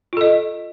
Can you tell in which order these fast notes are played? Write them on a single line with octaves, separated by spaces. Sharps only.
F4 A4 D#5